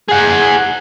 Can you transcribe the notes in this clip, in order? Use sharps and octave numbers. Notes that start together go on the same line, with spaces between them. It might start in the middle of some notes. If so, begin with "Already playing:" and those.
G#4 F#5